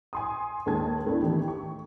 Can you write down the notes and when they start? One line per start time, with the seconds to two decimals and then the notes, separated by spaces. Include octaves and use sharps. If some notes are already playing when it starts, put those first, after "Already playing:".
0.13 G#5 C6 D#6
0.66 D#2 G#3 A4 A5 G#6
1.07 A3 B3 D4 E4
1.21 D#3 E3 G4
1.48 C#6